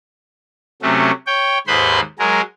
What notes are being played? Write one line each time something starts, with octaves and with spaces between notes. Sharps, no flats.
C3 F#3 A3 C#4
C#5 G5
D#2 G#2 B4 C5 B5 C6
F#3 G#3 G#4 A#4